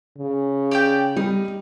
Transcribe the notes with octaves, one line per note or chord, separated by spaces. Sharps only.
C#3
G4 D5 G5
G3 D#4